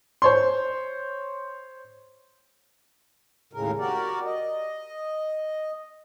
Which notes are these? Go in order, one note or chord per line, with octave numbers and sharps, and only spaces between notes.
C5 C#5 C6
D#2 A2 C#3 G#3 A#4
F#4 G4 A#4 D5
D#5